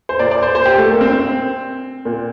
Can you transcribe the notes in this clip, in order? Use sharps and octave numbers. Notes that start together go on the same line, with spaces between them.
C5
A#2 D5
D5
C5
C5
G4
A3
A#3
C4
C4
A#2